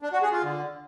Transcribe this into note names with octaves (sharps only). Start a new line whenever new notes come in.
D4
F#4
G#4
F4
D3